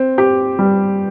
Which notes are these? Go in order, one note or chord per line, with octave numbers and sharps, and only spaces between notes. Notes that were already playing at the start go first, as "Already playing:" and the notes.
Already playing: C4
G4
G3